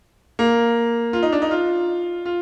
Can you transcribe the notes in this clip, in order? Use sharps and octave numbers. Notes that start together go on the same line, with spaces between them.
A#3
F4
D#4
D4
D#4
F4
F4